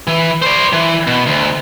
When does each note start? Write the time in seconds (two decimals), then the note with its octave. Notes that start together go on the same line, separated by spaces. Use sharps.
0.07 E3
0.42 C5 D5
0.73 E3
1.07 B2
1.27 D2